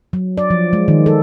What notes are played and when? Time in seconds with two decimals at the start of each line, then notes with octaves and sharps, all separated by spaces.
0.13 F#3
0.37 D5
0.50 F3
0.73 G#3
0.88 D#3
1.06 A4